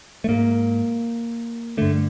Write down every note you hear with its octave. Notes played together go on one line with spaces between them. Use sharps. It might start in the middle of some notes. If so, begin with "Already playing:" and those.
A3
G#2 A#3
G2 D3 A3